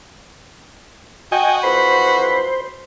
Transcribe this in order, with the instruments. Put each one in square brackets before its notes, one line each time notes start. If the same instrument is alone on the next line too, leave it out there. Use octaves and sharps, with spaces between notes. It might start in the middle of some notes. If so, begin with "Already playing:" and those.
[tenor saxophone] F#4 [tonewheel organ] D#5 G5 G#5
[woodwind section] F2 E3 B5 [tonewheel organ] C5